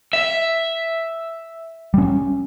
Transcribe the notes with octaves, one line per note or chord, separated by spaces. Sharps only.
E5
G3 C#4